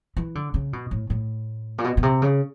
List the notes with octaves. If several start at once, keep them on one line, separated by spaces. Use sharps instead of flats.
E3
D3
C#3
B2
A2
A2
A#2
B2
B2
C3
C#3